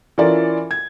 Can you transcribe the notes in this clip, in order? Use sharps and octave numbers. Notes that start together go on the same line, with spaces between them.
E3 C#4 F4 A4 A#4 D5
G#6